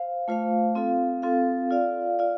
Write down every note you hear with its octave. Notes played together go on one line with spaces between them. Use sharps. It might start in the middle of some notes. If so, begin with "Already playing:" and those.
Already playing: C5 F5
A3 F4 C5 F5
C4 F4 A4 F5
C4 F4 A4 F5
F4 D5 F5
F4 D5 F5